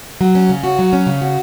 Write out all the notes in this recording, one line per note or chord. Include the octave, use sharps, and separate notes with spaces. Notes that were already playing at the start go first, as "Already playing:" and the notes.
F#3
C#4
C#3
F#4
F#3
C#4
C#3
F#4